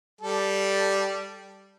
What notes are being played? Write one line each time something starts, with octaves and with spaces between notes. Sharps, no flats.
G3 A4